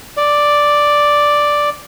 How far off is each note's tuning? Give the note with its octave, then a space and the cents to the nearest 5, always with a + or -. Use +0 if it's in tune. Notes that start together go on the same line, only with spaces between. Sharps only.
D5 +0